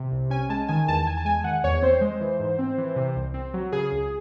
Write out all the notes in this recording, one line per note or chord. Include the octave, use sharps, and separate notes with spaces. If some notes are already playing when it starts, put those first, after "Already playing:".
Already playing: C3
C2
C#4 G#5
G#3 A5
D#3 G#5
E2 A5
E2 G#5
A5
G#3 G#5
D#3 F#5
E2 C#5
C4 C5
G#3
E3
G#2
C4
E3
C3
C2
C4
F#3
C#3 G#4
C#2